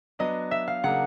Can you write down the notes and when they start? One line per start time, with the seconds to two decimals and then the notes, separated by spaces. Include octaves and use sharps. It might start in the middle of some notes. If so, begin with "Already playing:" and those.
0.19 F#3 B3 D4 D#5
0.51 E5
0.68 F5
0.84 C#3 F#3 A#3 D4 F#5